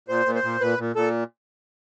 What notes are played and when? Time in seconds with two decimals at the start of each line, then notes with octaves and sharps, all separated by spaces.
0.09 A#2 C5
0.26 A#2
0.35 C5
0.43 A#2
0.61 A#2 B4
0.78 A#2
0.96 A#2 A4